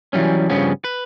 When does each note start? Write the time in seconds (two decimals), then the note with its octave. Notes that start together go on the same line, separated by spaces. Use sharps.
0.13 E3 F#3 G3 C#4
0.50 G2 C#3 F3 B3 C#4
0.84 B4